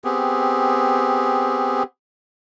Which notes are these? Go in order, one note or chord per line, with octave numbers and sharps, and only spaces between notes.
B3 C4 G4 G#4